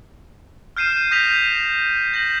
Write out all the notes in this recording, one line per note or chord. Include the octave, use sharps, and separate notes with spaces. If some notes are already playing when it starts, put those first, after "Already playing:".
F6 G6 C7 D#7 E7
D#6 G6 A#6 B6 D#7 F7
G6 A#6 F#7